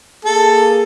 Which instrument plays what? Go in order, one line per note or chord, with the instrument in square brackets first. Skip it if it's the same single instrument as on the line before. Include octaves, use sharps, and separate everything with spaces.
[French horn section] A#3 G#4 [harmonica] A4